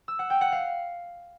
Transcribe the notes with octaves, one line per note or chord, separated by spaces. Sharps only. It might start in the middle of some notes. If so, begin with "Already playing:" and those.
E6
F#5
G5
F#5
F5